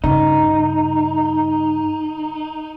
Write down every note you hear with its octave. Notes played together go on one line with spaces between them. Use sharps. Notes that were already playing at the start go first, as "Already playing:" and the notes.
G2 C#3 D#4